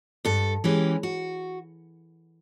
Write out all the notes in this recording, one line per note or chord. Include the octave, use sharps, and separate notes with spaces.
G2 A4
E3 G#3 C#4 G4
F#4